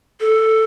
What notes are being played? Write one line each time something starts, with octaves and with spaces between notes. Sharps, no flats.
A4